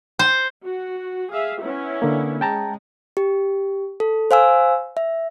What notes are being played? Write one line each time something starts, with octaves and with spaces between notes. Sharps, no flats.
C5
F#4
G#4 E5 F5
B3 C#4 E4
D3 A#3
G#3 G5 A5 A#5
G4
A4
C5 F5 G#5 E6
E5